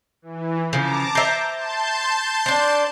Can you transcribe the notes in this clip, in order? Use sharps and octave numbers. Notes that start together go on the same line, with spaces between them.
E3
C#3 F3 A5 A#5 D6
C5 E5
A5 C6 G6
D4 C5